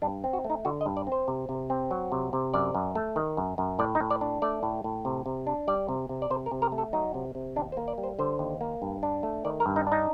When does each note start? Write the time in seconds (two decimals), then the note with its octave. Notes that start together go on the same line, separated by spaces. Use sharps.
0.02 G2 D4
0.24 C4
0.33 F#4
0.44 A3
0.50 D#4
0.65 D3 F#4
0.81 D#5
0.86 G2
0.97 D5
1.07 C4 C5
1.28 C3
1.49 C3
1.70 C4
1.91 F#3
2.12 C3
2.33 C3
2.54 F#2 D5
2.75 F#2
2.95 A3
3.16 D#3
3.37 F#2
3.58 F#2
3.79 A2 D5
3.95 D#4
4.01 A2
4.10 D5
4.21 D4
4.42 A3 D5
4.63 A2
4.84 A2
5.05 C3
5.26 C3
5.47 D4
5.67 G3 D5
5.89 C3
6.09 C3
6.22 D5
6.30 C3 C5
6.46 A#4
6.51 C3
6.62 A#4
6.72 A3
6.78 A4
6.93 F#3 D#4
7.14 C3
7.35 C3
7.56 D#2 D4
7.72 C5
7.77 A#3
7.88 D5
7.98 G3
8.03 C5
8.19 D3 C5
8.39 D#2
8.61 A#3
8.82 G2
9.03 D4
9.23 A3
9.45 D#3 D5
9.60 A#4
9.66 G2
9.76 D#4
9.87 D4 D#4